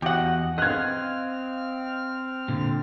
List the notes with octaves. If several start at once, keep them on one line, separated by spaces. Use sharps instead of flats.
E2 F#4 G4 D#5 F#5
C4 D#5 F5 F6 F#6 G#6
A#2 D3